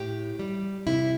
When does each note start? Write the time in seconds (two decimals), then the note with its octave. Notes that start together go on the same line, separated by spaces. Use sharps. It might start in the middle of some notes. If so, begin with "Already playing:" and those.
Already playing: A2 G4
0.39 G3
0.87 C3 E4